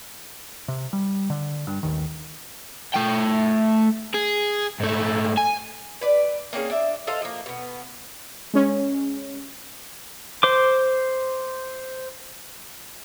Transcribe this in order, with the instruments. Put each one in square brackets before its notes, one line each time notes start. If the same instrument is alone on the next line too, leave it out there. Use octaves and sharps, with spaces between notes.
[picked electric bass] C3
G3
D3
G2
A1 D#2 D#3
[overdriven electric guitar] A3 G5
G#4
G#2 A3
G#5
[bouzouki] B4 D5
A#3 C4 C#4 G#4
D4 E5
A4 C5 D#5 F5
F3 A#3
B2 B3
[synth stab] G#3 C#4
[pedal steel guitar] C5 D6